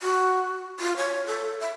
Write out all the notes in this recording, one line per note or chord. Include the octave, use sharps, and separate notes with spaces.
F#4
F4
C#5
A4
E5